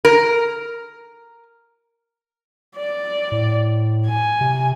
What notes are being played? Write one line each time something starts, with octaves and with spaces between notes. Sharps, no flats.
A#4
D5
A2
G#5
C3